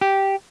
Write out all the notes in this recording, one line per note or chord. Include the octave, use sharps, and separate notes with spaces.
G4